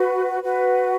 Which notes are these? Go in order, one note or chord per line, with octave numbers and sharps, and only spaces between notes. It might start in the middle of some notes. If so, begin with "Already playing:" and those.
Already playing: F#4 B4
F#4 B4